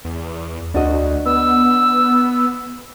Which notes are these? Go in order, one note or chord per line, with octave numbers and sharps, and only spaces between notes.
E2
D2 D4 F#4 D#5
B3 E6